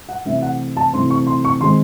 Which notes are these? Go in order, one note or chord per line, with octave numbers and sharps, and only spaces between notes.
F#5
C3 E3 A3 C4 E5
F#5
A5
C3 E3 A3 C4 C6
C#6
C6
C#6
D#3 G#3 C4 C6